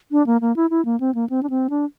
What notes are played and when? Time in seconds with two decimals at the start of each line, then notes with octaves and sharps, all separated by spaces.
0.12 D4
0.27 A#3
0.41 A#3
0.56 E4
0.70 E4
0.85 A#3
1.00 C4
1.15 A#3
1.30 C4
1.43 D4
1.50 C4
1.70 D4